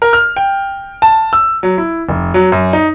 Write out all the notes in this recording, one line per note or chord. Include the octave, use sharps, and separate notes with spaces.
A#4
F6
G5
A5
E6
F#3
E4
F1
F#3
F#2
D#4